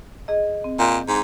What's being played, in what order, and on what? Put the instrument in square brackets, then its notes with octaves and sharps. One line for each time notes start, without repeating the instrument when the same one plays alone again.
[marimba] G#4 D#5
C4
[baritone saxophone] A#2 [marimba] G6
[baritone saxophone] G#2